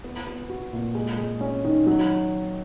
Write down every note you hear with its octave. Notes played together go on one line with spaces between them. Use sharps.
B3
B3
F#4
A#2
G#3
G#3
C#4
D#3
F#3